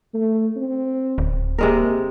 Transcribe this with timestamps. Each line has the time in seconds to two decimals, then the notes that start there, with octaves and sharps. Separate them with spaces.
0.14 A3
0.56 C4
1.18 D1
1.58 C3 G#3 A#3 A#4